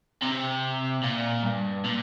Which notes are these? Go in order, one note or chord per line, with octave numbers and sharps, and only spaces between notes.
C3
A#2
G2
A#2